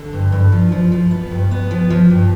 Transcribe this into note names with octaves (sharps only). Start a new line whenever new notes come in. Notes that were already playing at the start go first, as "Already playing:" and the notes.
Already playing: D3
G2
G2
F3
F3
F3
B3
G2
B3
F3
F3
G2